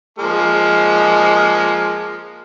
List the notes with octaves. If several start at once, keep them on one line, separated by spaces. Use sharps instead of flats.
F3 G#3 A#3